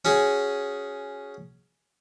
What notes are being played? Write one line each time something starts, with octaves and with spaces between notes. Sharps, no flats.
C#4 F#4 G#4